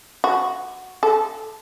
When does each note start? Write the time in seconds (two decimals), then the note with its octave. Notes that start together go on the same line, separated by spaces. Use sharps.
0.24 F#4
1.03 A4